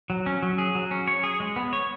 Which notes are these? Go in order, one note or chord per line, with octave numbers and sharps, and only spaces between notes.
F#3
C#4
F#3
G#4
F#3
C#4
C#5
G#4
G#3
B3
C#5